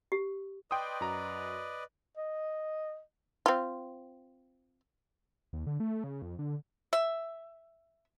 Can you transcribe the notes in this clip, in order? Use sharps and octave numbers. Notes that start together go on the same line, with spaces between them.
G4
B4 D5 D#5 G5 C6 D#6
F#2 F#4 A#5
D#5
C4 F4
D#2
D3
A3
C#3
F2
D3
E5